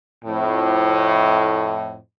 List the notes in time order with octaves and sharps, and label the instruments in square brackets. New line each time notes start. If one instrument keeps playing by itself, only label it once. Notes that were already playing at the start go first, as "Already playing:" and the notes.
[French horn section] F2 A2